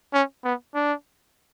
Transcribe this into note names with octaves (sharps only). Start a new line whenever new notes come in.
C#4
B3
D4